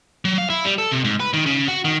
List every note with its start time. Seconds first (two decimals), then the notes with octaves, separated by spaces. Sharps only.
0.25 F#3
0.38 F5
0.50 E4
0.65 G3
0.78 A4
0.92 C3
1.04 G#2
1.20 B4
1.33 D#3
1.46 C#3
1.68 F#4
1.85 D#3